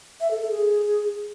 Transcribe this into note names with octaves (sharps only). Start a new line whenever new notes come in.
E5
A4
A4
G#4